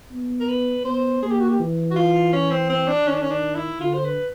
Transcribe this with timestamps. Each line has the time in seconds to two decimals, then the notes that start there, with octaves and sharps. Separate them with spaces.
0.12 B3
0.40 A#4
0.48 B4
0.85 B3 C5
1.22 A#3 G#4
1.30 G4
1.39 F#4
1.48 G4
1.60 E3
1.91 F#4
1.96 F4
2.33 C#4
2.51 C4
2.69 C4
2.88 D4
3.06 D#3 C#4
3.13 D4
3.21 C#4
3.30 D4
3.55 E4
3.79 D3 F4
3.94 C5
4.04 B4